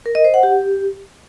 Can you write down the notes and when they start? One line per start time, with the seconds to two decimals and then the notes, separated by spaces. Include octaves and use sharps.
0.06 A#4
0.15 D#5
0.24 C5
0.34 F#5
0.43 G4